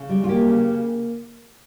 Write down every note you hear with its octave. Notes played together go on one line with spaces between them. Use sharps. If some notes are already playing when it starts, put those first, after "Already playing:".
Already playing: C#3
G3
F4
A#3 G4
C#3
A#3